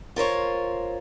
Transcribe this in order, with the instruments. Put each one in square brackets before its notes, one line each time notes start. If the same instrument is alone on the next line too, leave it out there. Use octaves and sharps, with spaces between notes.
[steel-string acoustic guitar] F4 A#4 C5 C#5